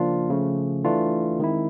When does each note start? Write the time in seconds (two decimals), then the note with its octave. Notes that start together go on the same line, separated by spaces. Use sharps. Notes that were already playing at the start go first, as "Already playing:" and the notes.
Already playing: C#3 F3 A#3 D4 F4
0.30 C#3 F3 A3
0.84 E3 A3 D4 F4
1.40 D#3 G#3 C4 E4